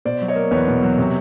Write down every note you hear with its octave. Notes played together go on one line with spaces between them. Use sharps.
B2 C5 D5
F#3
C#5 D#5
A#3
E2 B4 C#5
B2
F#3
C3